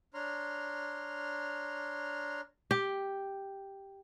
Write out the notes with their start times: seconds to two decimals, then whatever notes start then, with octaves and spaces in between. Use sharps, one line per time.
0.14 D4 C#5 A#5 C6 F6
2.71 G4